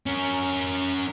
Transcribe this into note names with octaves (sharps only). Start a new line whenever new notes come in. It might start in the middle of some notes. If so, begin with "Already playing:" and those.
C#4 A#4